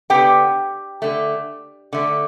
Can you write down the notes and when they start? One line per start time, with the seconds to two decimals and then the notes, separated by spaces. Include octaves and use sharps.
0.10 D3 B3 G4 G5
1.02 D3 A3
1.93 D3 A3